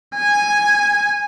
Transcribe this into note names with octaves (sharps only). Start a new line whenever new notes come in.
G#5